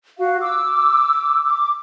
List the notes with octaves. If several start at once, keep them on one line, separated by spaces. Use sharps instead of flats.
F#4 F5
D6 E6
D6